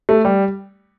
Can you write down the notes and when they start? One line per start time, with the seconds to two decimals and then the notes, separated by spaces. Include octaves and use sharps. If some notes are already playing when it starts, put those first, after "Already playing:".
0.09 A3
0.25 G3